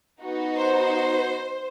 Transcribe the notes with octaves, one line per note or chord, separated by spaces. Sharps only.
B3 D#4 F#4
C5